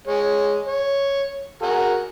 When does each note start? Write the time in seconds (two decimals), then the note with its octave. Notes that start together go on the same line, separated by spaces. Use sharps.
0.07 G#3 C#5
0.67 C#5
1.62 F#4 G#4 A#4